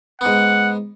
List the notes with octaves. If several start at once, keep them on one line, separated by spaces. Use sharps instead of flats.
G#2 B3 F#5